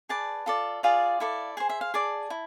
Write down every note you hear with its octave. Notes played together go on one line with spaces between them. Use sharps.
G#4 B4 D5 A5
F4 A4 D5
F4 G#4 D5 F5
E4 A4 D5
G#4 C5 G#5
E5
F5
G#4 D5 A5
E4